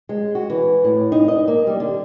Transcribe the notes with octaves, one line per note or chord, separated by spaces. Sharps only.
G#3
F#4
E3
A2
D#4
D#5
A#3
G3
D3